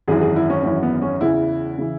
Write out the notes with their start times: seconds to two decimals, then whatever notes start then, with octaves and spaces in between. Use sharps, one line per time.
0.08 G#1 F#2 E3 G#4
0.21 G#4
0.36 E4
0.50 C#4
0.63 G#1 F#2 E3 C#4
0.83 B3
1.02 C#4
1.20 E2 C#3 E3 E4
1.78 C#3 E3